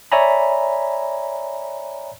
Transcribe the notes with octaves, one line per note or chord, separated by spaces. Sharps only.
C#5 D5 E5 G#5 A#5 B5